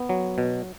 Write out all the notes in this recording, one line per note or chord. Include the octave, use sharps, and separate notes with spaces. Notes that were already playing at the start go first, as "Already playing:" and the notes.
Already playing: B3
F#3
B2